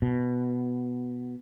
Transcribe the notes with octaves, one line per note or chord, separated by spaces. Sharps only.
B2